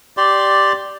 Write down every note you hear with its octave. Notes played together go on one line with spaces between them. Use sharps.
G4 D5 C6